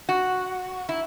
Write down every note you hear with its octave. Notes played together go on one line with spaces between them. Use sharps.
F#4
E4